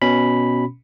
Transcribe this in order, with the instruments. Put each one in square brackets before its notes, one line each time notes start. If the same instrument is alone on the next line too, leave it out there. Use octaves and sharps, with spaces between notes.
[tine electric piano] B2 C#4 B5